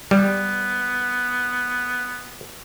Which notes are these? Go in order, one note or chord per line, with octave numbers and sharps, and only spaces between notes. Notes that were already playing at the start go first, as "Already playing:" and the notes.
G3 B3